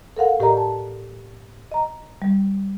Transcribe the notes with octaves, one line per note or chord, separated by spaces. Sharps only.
A4 A#4 F5 F#5
A2 G4 A#4 D5 D#5 A#5
A5
D#5 A#5
G3